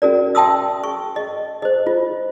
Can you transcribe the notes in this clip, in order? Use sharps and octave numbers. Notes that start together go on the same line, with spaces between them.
C#4 F#4 A#4 D5
E5 G5 A5 C6 D#6 E6
C#6
D#5
C5 D#5
F4